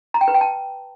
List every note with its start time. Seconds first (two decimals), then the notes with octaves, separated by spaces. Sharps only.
0.14 A#5
0.21 G5
0.28 B4
0.34 G5
0.41 A5